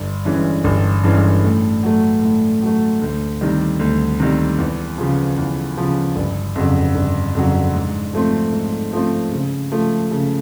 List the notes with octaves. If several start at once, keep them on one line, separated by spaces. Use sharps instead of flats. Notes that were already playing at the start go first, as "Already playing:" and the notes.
Already playing: G1
G2 E3 G#3 C#4
G1
G2 E3 G#3 C#4
A2
F#3 A3
A2
F#3 A3
D2
C3 D#3 G3
D2
C3 D#3 G3
E2
C#3 F3
E2
C#3 F3
G1
F2 C#3 F#3
G1
F2 C#3 F#3
G#2
F3 A3 C4
G#2
F3 A3 C4
C#3
F3 A3
C#3